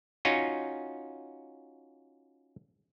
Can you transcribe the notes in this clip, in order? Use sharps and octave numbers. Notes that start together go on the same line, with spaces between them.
C#4 D#4 F4 F#4